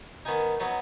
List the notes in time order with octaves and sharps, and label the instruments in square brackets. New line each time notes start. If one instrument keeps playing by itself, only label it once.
[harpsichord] D#3 B3 D#4 G#5
F#3 B3 D#4